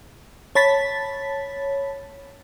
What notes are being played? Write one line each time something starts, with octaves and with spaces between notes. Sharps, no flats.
C#5 A5 B5 A6 B6